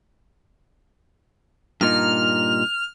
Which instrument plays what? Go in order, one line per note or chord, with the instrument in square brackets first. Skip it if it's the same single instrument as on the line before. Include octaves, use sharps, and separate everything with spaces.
[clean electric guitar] G2 A#2 D#4 [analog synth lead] F6